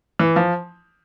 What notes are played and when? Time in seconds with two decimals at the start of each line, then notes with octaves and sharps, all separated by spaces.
0.19 E3
0.36 F3